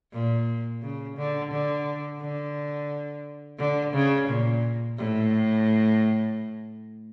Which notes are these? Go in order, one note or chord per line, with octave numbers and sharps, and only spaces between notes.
A#2
C#3
D3
D3
D3
D3
C#3
A#2
A2